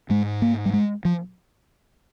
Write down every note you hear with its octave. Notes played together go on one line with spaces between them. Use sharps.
G#2 G#3
A#3
G3
G#3
F3